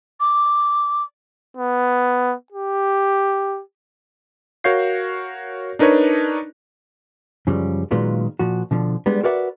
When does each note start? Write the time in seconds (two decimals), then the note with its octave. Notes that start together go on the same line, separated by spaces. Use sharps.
0.20 D6
1.57 B3
2.52 G4
4.64 F#4 A#4 C#5 F5 G6 C7
5.79 D4 D#4 A#4 B4 C#5
7.47 F#2 C#3 F3 G3
7.91 A#2 D#3 F#3 G#3 B3 F4
8.39 A#2 F3 F#4
8.71 B2 D3 F3
9.06 G3 G#3 B3 D4
9.23 F#4 A#4 B4 D5 E5 F#5